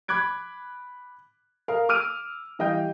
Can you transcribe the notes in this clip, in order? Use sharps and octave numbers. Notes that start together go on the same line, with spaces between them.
B5 D6 F#6 G#6 D7
A#4 F5 D#6
D6 E6 F6 D7 D#7
E3 G3 D#5 F5 G5 G6